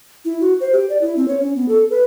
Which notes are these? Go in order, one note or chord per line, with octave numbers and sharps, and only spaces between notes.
E4
F#4
C5
G4
D5
E4
C4
C#5
C#4
B3
A4
B4